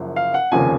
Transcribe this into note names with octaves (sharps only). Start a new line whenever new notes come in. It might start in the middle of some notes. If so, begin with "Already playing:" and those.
Already playing: F#1 F#2 F3
F5
F#5
F1 D#2 C#3 F3 G#5